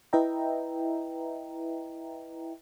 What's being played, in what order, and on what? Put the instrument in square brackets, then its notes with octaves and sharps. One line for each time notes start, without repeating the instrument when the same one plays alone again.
[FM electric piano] E4 B4 D#5 E5 G5 A#5